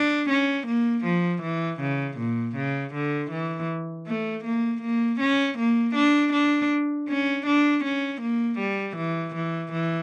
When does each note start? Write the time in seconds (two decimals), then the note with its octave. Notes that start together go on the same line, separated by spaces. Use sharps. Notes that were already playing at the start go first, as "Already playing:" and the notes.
Already playing: D4
0.29 C#4
0.67 A#3
1.05 F3
1.42 E3
1.80 C#3
2.18 A#2
2.56 C#3
2.94 D3
3.31 E3
4.06 A3
4.44 A#3
4.81 A#3
5.20 C#4
5.58 A#3
5.95 D4
6.33 D4
7.09 C#4
7.46 D4
7.84 C#4
8.21 A#3
8.59 G3
8.97 E3
9.35 E3
9.72 E3